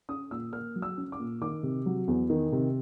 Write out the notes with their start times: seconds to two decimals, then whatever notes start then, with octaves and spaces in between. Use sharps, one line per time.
0.09 C#4 D#6
0.31 A#2 E6
0.53 A#3 F6
0.76 F#3
0.82 E6
0.98 C#4
1.12 D6
1.20 A#2
1.41 D#3 D6
1.63 C3
1.86 F#3
2.08 E2
2.30 D#3
2.52 C3